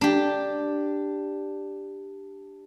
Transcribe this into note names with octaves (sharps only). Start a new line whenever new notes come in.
D4 G4